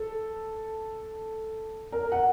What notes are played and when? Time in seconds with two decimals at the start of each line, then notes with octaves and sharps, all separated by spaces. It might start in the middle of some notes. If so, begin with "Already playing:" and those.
Already playing: A4
1.92 A#4
2.12 F#5